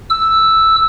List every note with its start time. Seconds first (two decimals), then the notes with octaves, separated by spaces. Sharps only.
0.10 E6